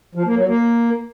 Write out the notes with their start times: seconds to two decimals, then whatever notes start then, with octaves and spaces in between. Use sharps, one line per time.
0.15 F3
0.26 A#3
0.37 F#3
0.48 A#3